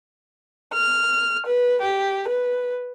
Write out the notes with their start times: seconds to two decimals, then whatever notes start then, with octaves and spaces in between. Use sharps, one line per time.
0.73 F6
1.46 B4
1.81 G4
2.28 B4